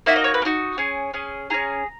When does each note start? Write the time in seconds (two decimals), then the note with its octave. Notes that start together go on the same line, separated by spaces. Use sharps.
0.06 A#3 D#4 F#4 E5
0.16 D#5
0.24 C#5
0.34 B4
0.42 A#3
0.45 D#4 F#4
0.78 C#4 G#4
1.14 C#4 G#4
1.50 E4 G#4 A#5
1.54 C#4